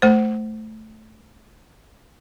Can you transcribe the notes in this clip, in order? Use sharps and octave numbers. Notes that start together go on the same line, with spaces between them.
A3 C5